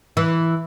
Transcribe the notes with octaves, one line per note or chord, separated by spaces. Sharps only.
E3